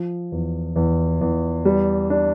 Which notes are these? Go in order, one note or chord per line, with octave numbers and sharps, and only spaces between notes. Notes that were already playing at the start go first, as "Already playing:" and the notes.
Already playing: F3
E2
E2
E2
G3
D4